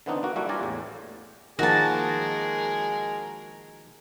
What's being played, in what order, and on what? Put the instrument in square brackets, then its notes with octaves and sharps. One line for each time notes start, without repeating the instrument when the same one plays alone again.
[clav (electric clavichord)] D3 E3 B3 C4 D4 D#4
A#3 F#4
G3 A#3 D4 E4 F#4
G3 F4 D5 G#5 A#5
E2 A2
[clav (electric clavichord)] D#3 F3 A#3 [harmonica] G#3 G#4 A#4 [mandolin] F#4 A5